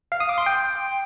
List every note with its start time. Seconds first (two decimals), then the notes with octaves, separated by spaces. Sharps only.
0.12 F5
0.20 D#6
0.29 D6
0.38 C6
0.46 G5